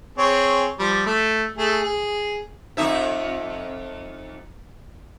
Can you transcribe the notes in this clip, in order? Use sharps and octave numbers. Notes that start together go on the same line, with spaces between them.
C4 G#4 C#5
F3 G3
A3
A3 G#4
G#4
F2 D#4 E5